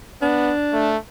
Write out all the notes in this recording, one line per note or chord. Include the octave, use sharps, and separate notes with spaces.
B3 D4
A3